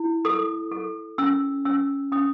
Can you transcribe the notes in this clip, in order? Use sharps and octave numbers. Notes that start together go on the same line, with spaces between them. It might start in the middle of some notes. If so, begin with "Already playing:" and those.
Already playing: E4
A4 D#6
A4
C#4 E6
C#4 E6
C#4 D#6